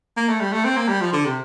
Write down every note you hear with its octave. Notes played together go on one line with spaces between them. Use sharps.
A#3
A3
G3
A3
C4
A#3
G3
F3
D3
C3